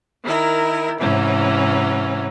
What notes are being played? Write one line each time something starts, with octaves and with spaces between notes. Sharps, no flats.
D#3 E4 A#4
G#2 C3 E3 F#3 C#4